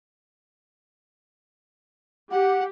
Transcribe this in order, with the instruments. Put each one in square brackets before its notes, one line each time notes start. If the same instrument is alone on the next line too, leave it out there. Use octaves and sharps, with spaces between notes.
[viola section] G4 [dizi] F#5